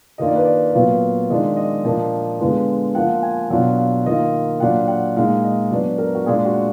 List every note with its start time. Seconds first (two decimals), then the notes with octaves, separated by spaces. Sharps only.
0.18 D#3 A#3 D4 F4 D#5
0.28 D5
0.35 B4
0.44 D5
0.74 A#2 F#3 B3 F4
1.30 D#3 G#3 D4 F4 D#5
1.57 D#5
1.84 A#2 F3 A#3 D4
2.40 D3 G#3 B3 F4
2.95 F3 A#3 F4 F#5
3.23 G#5
3.50 B2 F#3 D4 F4 F#5
3.78 F5
4.06 D#3 A#3 F4 D#5
4.60 A#2 F#3 D4 F4 F#5
4.88 F#5
5.16 A#2 G#3 D#4 F5
5.44 D#5
5.71 F#3 B3 D4 D5
5.98 A#4
6.15 F#4
6.26 A#2 G#3 D4 F4 G#4
6.45 F#4